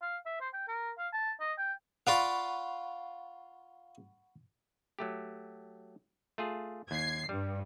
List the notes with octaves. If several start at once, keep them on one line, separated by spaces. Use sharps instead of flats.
F5
E5
C5
G5
A#4
F5
A5
D#5
G5
F4 D5 F5 F#5 B5 C#6
F#3 A3 G4
A3 F4 G#4
D#2 G#6 C7
G2 G3